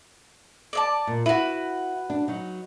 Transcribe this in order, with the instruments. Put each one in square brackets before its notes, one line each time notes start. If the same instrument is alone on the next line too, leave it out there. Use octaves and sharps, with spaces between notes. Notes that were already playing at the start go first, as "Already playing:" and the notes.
[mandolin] D5 E5 A5
[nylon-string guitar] A#2
[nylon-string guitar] E4 [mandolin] F#4 B4
[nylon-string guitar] D4
F#3 D#4